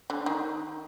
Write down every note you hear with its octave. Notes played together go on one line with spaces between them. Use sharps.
D3
D#3